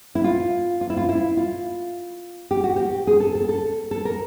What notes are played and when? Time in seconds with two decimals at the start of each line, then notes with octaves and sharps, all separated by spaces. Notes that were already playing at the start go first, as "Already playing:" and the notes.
0.15 E4
0.24 F4
0.81 F4
0.90 E4
0.97 F4
1.09 E4
1.37 F4
2.51 G4
2.64 F#4
2.76 G4
3.07 G#4
3.20 A4
3.35 A4
3.49 A4
3.91 A4
4.05 A#4